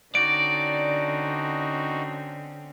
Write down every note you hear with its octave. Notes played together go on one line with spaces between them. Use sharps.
D3 C4 C#4 D#4 F#4 D5 D7